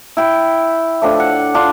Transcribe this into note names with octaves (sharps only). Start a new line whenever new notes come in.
E4 G5
A2 F3 D4
F#5
D4 F4